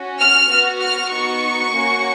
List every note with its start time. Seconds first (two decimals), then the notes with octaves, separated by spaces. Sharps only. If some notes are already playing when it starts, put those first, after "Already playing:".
Already playing: C#4 F#4
0.20 F6
0.51 B3 F#4
0.82 F6
1.12 B3 D#4 F#4 C#6
1.74 A#3 C#4 F#4